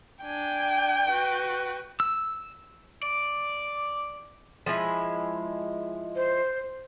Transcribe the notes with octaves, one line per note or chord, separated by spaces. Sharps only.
D4 G5 G#5
F#4 B4
E6
D5 D6
F3 G#3 E4
C5